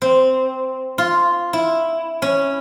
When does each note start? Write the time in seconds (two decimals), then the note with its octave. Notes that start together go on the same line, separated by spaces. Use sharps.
0.02 C4
0.98 F4
1.53 E4
2.22 C#4